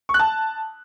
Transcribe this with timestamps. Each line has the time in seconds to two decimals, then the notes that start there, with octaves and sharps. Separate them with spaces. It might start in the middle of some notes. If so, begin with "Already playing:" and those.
0.09 C#6
0.14 F#6
0.19 A5